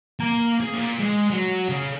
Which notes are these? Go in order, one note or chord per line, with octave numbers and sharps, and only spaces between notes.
A#3 A#5
G#4
A#2
G#3
F#3
C#3